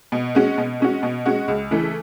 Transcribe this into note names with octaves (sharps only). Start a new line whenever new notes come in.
B2
G#3 C#4 F#4
B2
G#3 C#4 F#4
B2
G#3 C#4 F#4
C#2
C#3 E3 A3 E4